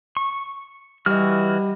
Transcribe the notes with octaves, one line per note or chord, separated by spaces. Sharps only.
C#6
E3 G3 F#4 D#5 F6